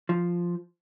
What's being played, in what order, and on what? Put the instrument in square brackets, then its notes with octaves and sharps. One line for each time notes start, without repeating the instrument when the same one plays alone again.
[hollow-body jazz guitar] F3